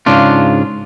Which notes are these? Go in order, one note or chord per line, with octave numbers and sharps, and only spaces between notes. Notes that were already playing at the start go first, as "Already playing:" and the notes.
G#2 C#3 D4 F4